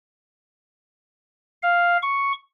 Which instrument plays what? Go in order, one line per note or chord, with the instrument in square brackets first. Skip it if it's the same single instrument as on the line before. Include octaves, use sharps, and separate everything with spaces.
[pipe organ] F5
C#6